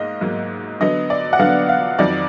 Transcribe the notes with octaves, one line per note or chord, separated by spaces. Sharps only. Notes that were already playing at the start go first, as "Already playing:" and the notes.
Already playing: G#2 A#3 D#5 F5
G#2 F#3 A#3
D3 F#3 B3 D#5
D5
F#5
D3 F#3 B3 F5
F5
F2 D#3 F#3 D5